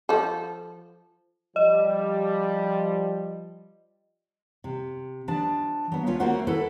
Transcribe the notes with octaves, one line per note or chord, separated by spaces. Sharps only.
F3 A4
F3 G3 D#5
C3
F3 D4 A5
F#3 B3
D2 C#4 F4 C#5
A3 A#3 C#4 F#4 C5 F#5
E4 A4 B4